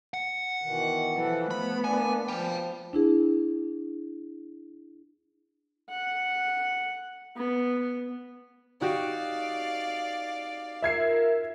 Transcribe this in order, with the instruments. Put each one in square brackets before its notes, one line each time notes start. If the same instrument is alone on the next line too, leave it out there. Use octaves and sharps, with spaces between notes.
[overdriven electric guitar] F#5
[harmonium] B2 D#3 E3
[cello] E3 A4 [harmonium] F3 B4
[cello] A3 B3 [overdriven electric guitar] B5
[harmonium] A#3 D4 D5 [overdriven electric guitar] G#5
[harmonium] F3 [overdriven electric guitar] G5 B5
[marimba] D4 E4 G#4
[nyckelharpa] F#5
B3
[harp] D#4 F#4 G4 [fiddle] D5 F5
[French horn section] F4 A#4 [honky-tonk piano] E5 G#6 C7